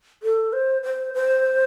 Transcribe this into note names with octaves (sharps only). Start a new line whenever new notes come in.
A4
C5
C5
C5